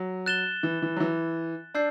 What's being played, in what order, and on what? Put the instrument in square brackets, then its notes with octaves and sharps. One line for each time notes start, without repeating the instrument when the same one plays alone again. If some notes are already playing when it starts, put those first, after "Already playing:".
Already playing: [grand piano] F#3
[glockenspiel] F#6 A6 E7 G7
[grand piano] E3
E3
F#3
E3
[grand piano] D4 [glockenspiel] A5 E6 G6 C7